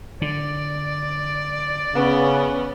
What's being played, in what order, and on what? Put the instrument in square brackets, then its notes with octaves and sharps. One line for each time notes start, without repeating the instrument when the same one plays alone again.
[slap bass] D3 [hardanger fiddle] D5
[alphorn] C#3 [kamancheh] B3 C#4